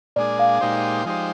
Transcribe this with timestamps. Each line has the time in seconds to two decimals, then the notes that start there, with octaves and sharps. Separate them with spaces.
0.16 A#2 G#3 D4 G#4 D5
0.39 F5
0.61 A#2 G#3 D#4 G4 C5
1.05 F3 G#3 D#4 G4 C5